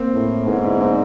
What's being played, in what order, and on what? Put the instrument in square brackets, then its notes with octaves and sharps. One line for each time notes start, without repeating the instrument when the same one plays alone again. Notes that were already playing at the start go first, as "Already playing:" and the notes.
Already playing: [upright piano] A#3 C4
[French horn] A2
[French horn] G#2 [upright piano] B3 C#4
[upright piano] D4 E4
C4 D4